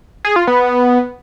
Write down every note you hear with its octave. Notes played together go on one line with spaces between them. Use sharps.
G#4
F4
B3